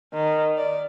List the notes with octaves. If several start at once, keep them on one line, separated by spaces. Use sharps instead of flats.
D#3
D5